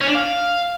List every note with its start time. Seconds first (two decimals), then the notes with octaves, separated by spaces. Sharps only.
0.01 C#4
0.08 D4
0.15 F5